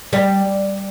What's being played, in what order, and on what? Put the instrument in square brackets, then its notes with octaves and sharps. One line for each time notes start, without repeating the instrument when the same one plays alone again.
[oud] G3